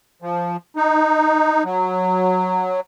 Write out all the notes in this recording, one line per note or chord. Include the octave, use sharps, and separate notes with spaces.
F3
D#4
F#3